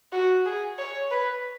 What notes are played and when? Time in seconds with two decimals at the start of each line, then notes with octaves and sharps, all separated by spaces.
0.12 F#4
0.46 G#4
0.78 C#5
1.11 B4